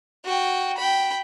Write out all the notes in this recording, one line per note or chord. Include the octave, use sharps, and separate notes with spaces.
F#4 G5
G5 B5